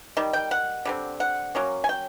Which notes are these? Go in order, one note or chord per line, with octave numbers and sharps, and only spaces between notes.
D#3 G3
G5
F#5
D3 G3 C4
F#5
F#3 A#3 C#4
G#5
G5